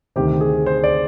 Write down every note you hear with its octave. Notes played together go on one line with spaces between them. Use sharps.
D2 C3 D#3 G4
G#4
C5
D5